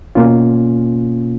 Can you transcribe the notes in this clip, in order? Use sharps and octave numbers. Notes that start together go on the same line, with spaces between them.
B2 A#3 C#4 F4